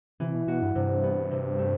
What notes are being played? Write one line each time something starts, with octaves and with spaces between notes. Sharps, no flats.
C3 E3
B2
B2 F#4
G2
G2 C3
B3
C3
A3